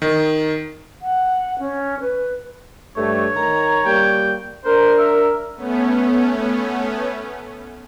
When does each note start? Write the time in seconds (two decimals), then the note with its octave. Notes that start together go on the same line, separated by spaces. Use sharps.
0.02 D#3
1.02 F#5
1.59 C#4
2.00 B4
2.96 G2 A3 C#5
3.34 D#3 A#5
3.84 G3 A#3 G5
4.64 D4 A#4 C5
4.98 E5
5.55 A3 B3 C#4